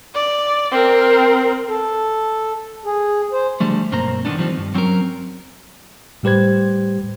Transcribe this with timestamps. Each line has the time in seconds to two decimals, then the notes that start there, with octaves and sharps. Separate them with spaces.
0.15 D5
0.71 C4 A#4
1.69 A4
2.86 G#4
3.32 C5
3.60 D3 F3 G3 A3
3.92 B1 G2 A#3 C4 C5 A#5
4.25 D3 D#3 F#3 G3 B3 D4
4.38 D#3 F3 G3 A3 C4 D#4
4.57 G2
4.74 F#3 C4 C#4 F#4 A#4
6.23 A2 G3 G4 B4 C5 G#6